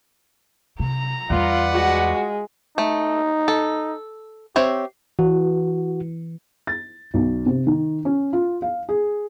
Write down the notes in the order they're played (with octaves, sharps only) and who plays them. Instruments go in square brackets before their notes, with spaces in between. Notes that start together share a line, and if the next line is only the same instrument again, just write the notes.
[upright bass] C3 [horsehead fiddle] A#5
[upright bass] E2 G3 [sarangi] F4 [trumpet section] B4 D5 F#5
[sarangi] G#3 [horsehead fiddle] F#4
[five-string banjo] A3 [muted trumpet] D#4
[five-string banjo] A4
[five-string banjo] C4 C#5 E5 [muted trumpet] G4
[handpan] E3 [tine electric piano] F#4
[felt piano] A6
B1
C3
D#3
C#4
F4
F5
G#4